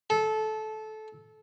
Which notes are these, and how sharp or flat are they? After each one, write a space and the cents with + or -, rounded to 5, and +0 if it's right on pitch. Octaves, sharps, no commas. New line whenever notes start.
A4 -20